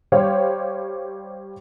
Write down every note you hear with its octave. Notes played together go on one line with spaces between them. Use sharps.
G3 G4 C5 C#5 F5